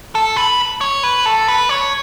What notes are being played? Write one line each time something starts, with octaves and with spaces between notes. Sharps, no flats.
A4
B4
C#5
B4
A4
B4
C#5